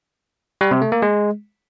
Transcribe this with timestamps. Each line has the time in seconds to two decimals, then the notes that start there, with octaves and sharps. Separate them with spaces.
0.61 G3
0.71 C3
0.82 A3
0.92 A#3
1.02 G#3